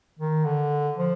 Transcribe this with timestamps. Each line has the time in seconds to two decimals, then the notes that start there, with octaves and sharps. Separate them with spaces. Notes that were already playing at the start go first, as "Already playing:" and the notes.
0.19 D#3
0.45 D3
0.98 F3